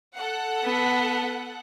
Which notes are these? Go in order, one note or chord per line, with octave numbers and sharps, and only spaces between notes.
A4 F#5
B3